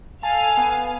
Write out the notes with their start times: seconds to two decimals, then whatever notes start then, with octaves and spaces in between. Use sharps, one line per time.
0.23 A4 F5 G#5
0.57 B3